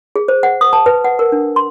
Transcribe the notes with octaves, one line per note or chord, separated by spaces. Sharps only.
G#4
C5
F#5
D#6
A5
B4
F#5
A#4
D4
C6